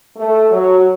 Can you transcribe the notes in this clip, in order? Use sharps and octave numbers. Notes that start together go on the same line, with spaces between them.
A3
F#3